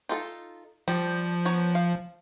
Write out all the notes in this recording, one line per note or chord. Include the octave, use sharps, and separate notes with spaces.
D#4 F4 A4
F3 G3
B3 C#5 A#5
F5